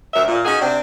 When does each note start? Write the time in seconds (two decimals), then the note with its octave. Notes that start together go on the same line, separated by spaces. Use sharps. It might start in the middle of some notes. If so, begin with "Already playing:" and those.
0.14 D2 F#3 A#4 E5
0.27 A#2
0.45 C#4 D#4 F#4 G#4
0.60 C3 C4 D4